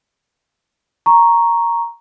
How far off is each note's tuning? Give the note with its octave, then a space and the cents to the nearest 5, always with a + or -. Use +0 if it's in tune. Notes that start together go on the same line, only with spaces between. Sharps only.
A#5 +0 C#6 +0